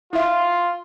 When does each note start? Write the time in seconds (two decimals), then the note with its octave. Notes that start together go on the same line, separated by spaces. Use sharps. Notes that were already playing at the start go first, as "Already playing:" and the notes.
0.13 E4 F4 E5